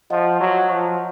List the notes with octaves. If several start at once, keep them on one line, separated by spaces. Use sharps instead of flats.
F3 D#5 F#5
F#3
F3